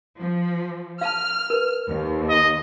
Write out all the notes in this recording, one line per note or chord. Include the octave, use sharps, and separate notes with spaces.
F3
F5 A5 F6
A#4 B4
D#2
D#5